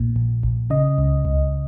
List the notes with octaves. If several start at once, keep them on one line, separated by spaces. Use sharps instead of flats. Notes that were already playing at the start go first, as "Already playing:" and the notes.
Already playing: A#1 A#2
A#1
A#1
C#3 D#5
C#2
C#2